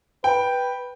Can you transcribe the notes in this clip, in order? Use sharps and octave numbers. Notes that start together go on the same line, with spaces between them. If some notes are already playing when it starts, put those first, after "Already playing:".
B4 G5